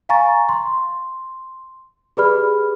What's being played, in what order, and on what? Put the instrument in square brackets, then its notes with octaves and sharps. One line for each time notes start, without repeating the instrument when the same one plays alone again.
[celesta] F5 G#5 A#5 C#6 A6
C6
G4 G#4 B4 D5 B5 F6